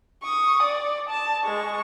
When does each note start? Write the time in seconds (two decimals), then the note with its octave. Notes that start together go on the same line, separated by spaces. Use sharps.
0.23 C#6 D#6
0.63 D5
1.09 A5
1.44 G#3 C#6